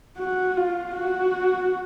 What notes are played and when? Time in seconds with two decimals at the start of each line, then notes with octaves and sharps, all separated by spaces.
0.18 F#4
0.57 F4
0.95 F#4